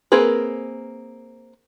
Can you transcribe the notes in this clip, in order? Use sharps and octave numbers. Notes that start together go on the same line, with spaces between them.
A#3 C4 G#4 A#4 B4